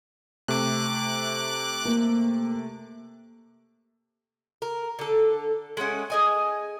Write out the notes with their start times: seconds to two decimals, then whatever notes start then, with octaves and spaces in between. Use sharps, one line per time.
0.48 C3 A3 D6 F#6
1.85 A#3
4.62 A#4
4.99 D3 A4
5.77 G#3 A3 C#4 F#5
6.10 G#4 D#5 G#5